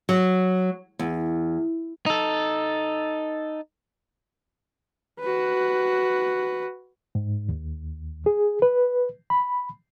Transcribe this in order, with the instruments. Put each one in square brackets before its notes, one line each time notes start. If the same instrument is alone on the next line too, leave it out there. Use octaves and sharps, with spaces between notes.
[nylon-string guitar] F#3
E2
[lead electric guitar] D#4 A4
[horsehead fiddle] F#4 B4
[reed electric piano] G#2
D#2
G#4
B4
B5